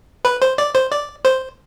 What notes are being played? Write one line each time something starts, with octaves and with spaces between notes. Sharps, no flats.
B4
C5
D5
C5
D5
C5